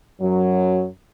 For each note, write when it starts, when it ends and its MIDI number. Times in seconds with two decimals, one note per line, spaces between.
0.21 0.87 42
0.21 0.87 54